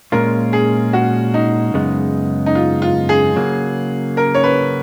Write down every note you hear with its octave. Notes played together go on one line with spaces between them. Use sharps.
A#2 G#3 C#4 F4 A#4
G#4
F#4
D#4
F#2 C#3 G#3 B3
D#4
F4
F4
G#4
C#3 F#3 A#3
A#4
C#5
B4